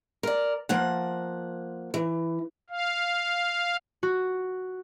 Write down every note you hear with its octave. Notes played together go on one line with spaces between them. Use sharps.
A#4 D5
F3 A#3 F#5
E3
F5
F#4